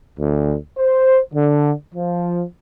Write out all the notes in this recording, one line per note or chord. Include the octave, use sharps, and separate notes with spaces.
D2
C5
D3
F3